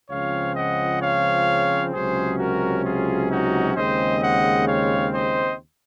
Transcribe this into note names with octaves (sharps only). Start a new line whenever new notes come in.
C#2 C#3 F3 C4 C#5 F5
D#5 F#5
C#5 F5
C#2 C3 F#3 C#4 G#4 C5
F#4 A#4
F4 G#4
D#4 F#4
D#2 C#3 G#3 C4 C5 D#5
D#5 F#5
C#5 F5
C5 D#5